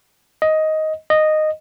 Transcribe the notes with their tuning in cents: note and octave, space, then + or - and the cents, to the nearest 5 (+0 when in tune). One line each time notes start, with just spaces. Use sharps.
D#5 +10
D#5 -10